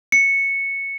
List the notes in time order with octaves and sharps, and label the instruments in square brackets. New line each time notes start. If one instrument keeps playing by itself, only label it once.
[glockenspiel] C#7